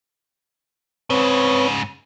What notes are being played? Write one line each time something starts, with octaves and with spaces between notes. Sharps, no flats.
G#2 C#3 C4 B4 C#5